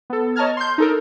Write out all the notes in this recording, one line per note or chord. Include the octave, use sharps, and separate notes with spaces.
B3 A4
C#5 D#5 A5 A#5 F6 G#6
C6 G6
D#4 A4 A#4